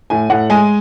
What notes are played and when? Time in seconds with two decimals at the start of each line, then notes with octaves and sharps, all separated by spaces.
0.10 A2 G#5
0.30 A2 F#5
0.50 G#3 G#5